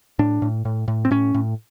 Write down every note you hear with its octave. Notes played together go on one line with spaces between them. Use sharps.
A2 D4
A2
A2
A2
C4
A2 C#4
A2